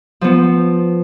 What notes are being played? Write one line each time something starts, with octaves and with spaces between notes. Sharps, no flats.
F3 B3